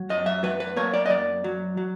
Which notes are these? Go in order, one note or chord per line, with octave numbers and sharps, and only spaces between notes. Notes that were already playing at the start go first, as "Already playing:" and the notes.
Already playing: F#3
F#2 D#5
E5
F#3 B4
B4
A#3 C#5
D5
D#5
F#2 D5
F#3
F#3